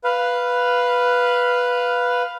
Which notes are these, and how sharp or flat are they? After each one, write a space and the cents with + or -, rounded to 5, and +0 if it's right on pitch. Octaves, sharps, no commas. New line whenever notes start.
B4 +0 F5 +0